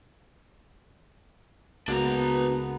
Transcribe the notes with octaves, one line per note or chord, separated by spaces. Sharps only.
C#2 G#3 A#3 B3 D4 F#4 A#5